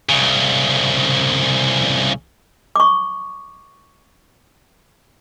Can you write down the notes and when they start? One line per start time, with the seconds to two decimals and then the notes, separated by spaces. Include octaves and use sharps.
0.09 C2 C#3
2.76 C#6 D6